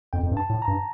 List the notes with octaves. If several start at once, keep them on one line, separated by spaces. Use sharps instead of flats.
F2 G5
F2
G2
A5
A2
A#5
G2